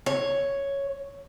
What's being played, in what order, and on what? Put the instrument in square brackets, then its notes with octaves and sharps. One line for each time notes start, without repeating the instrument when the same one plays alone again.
[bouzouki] C#5